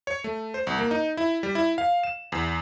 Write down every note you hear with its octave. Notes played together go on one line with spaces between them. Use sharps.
C#5
A3
C5
C2
A#3
D#4
E4
G3
E4
F5
E7
E2